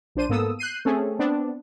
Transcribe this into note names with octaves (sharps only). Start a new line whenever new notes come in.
A#1 D4 C5 D#7
G#2 A#3 B3 A4 D#6 E6
F#6 G6 C7 D#7
A3 C4 C#4 G#4 A4
B3 C4 D4